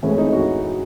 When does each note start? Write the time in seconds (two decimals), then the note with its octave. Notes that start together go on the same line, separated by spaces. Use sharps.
0.03 A2 E3 G#3 C#4
0.18 D#4
0.32 F#4